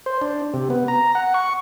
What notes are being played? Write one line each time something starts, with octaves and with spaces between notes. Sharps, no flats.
C5
D4
C3
B3
A#5
F#5
C#6